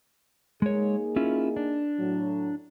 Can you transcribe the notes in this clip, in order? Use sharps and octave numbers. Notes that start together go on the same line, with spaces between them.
G#3 A#3 D#4 G#4 C#5
C#4 E4 F4
D4
A2 F#3